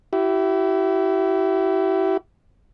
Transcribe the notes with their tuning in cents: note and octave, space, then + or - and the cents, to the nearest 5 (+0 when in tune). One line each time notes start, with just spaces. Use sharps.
E4 +10 G4 -40